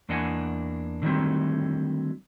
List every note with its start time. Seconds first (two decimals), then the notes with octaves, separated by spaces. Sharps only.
0.09 E2 A#3 D4 D#5 F#5 G#5
1.02 D3 D#3 F#3 G3 A3 C4